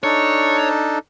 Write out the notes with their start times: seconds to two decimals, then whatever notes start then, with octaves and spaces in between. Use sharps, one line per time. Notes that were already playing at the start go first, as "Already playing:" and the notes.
0.04 D4 D#4 A4 C#5